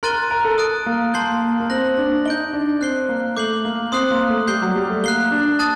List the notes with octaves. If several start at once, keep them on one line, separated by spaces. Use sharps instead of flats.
A#4 C6 F#6 A6 D#7 G7
A#4
A4
D#6 F#6 A6 D7
A#3
A#3 A5 C6 G6 C7 G7
A#3
A#3
C4 F#6 A#6 F#7
D4
D#4 G6 D7 G7
D4
C4 F#6 C7 G7
A#3
A3 D6 G6 C7 F#7
A#3
C4 C6 D#6 F#6 C7
A#3
A3
G3 G6 C7 G7
F#3
G3
A3
A#3 F#6 C7 G7
D4
A5 D#6 F#6 A6